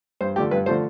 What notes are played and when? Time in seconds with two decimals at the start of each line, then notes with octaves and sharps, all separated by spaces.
0.21 G2 C5
0.36 D3 F3 A3 G4
0.51 G2 B4
0.66 D3 F3 A3 C5